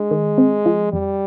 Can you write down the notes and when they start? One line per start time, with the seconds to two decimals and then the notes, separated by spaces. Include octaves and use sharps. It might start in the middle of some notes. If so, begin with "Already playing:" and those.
Already playing: G#3 D4
0.11 D#3
0.38 C4
0.66 F3
0.93 F2 G3